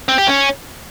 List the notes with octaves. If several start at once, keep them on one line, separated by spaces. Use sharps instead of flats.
C4
G4
C#4